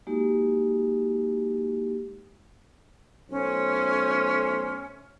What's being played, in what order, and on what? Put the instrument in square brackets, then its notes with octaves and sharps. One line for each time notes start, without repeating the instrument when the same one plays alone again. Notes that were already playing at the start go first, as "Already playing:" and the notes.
[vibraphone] G#3 A#3 D#4 F#4 G4
[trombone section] B1 A3 C5 [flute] C#4